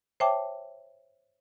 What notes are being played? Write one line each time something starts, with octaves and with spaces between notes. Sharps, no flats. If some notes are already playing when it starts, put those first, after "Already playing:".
C5 C#5 E5 G5 A5 D6